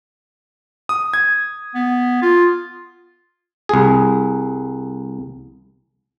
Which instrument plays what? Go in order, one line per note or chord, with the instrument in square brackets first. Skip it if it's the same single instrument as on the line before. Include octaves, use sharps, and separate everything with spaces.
[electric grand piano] D#6
G#6
[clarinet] B3
F4
[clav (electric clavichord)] C2 G#4